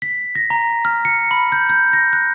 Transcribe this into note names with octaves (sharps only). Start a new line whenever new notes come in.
B6
A#6
A#5
F6
C#7
B5
G6
G6
A#6
F#6